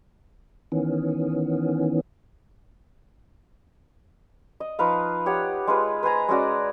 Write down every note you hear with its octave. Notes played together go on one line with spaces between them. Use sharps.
D#3 E3 B3 C#4
D#5
F3 D#4 B4 F5
G4 C#5 F#5
G#3 F4 B4
B4 C5 G#5 A#5
G#3 C#4 F#4 D5